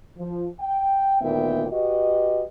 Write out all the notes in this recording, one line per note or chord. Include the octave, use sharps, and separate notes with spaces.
F3
G5
D2 A#2 D#3 B3 E5 G5
F#4 G4 B4 D#5